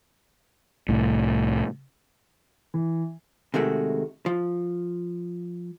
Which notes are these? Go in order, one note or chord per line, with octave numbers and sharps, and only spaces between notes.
C2 A2
E3
C3 D#3 G#3 A3 F#4
F3